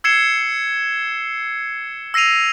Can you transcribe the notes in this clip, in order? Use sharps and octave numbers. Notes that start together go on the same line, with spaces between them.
E6 G#6 C7 C#7 E7 G7
E6 A#6 C7 D#7 F7